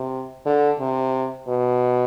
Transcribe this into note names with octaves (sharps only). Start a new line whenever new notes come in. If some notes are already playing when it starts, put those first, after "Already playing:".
Already playing: C3
D3
C3
B2